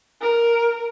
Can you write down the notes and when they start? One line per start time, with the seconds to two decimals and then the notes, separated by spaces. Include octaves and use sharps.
0.21 A#4